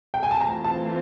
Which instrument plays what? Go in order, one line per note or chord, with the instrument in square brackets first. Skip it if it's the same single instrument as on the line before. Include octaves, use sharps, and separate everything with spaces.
[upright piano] G5
G#5
A5
[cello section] E3 A3 C4 F4 [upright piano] A#5
[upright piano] A5